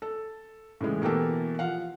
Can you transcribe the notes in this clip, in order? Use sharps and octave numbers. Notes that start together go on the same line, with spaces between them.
A4
A2 C#3 E3 G#3
B2 E3 A#3 G4 A4
F3 F5 F#5